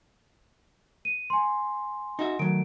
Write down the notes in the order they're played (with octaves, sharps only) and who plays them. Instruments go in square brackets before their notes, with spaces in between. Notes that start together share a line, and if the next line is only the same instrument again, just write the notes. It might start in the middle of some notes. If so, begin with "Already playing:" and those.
[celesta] D#7
G#5 C6
[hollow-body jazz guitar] D#4 F#4 E5
[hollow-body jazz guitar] D#3 F#3 A3 [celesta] D7